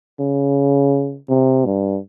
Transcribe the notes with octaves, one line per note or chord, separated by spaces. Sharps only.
C#3
C3
G2